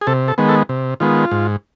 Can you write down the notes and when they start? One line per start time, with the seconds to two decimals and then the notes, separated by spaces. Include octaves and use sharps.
0.01 G#4
0.07 C3 A4
0.28 A4
0.38 D#3 G#3 B3
0.49 A4
0.69 C3
1.00 D#3 G#3 B3 F4
1.31 G#2